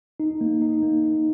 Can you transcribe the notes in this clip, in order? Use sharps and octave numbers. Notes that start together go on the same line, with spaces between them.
D#4
A#3
D#4
A#3
D#4